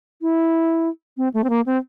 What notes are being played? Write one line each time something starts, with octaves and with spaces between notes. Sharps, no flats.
E4
C4
A3
C4
A#3
C4